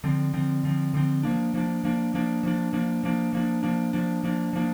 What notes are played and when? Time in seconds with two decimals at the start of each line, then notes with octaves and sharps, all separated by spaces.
0.04 D3 F3 C4
0.33 D3 F3 C4
0.63 D3 F3 C4
0.94 D3 F3 C4
1.23 F3 A#3 D4
1.54 F3 A#3 D4
1.84 F3 A#3 D4
2.14 F3 A#3 D4
2.43 F3 A#3 D4
2.73 F3 A#3 D4
3.03 F3 A#3 D4
3.33 F3 A#3 D4
3.63 F3 A#3 D4
3.93 F3 A#3 D4
4.23 F3 A#3 D4
4.53 F3 A#3 D4